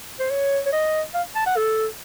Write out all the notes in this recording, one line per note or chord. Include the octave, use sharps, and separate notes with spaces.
C5
C#5
C#5
D#5
F5
A5
F#5
A4